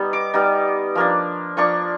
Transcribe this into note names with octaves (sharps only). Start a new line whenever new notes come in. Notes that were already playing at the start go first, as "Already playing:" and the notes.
Already playing: G3 B3 D#4
D6
G3 B3 D#4
F3 A#3 D4
F3 A#3 D4 C#6